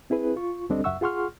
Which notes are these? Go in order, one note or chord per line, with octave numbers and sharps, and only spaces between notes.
C4 E4 G#4 B4
F4 C#6
D2 G3 C4 D4 A4 D#5
C#2 F#2 E5 F#5 C#6 E6
F4 G#4 F#5 C6 C#6 F6